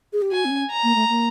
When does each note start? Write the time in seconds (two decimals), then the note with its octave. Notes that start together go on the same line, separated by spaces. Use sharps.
0.13 G#4
0.22 G4
0.32 F#4 G#5
0.45 C4
0.51 C#4
0.71 A#5
0.83 A#3
0.96 A3
1.09 A#3